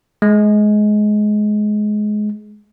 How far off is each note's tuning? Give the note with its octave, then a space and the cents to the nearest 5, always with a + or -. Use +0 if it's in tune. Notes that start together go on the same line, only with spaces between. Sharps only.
G#3 +20